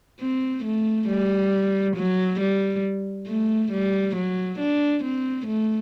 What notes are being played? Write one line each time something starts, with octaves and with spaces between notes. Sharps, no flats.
C4
A3
G3
F#3
G3
A3
G3
F#3
D4
C4
A3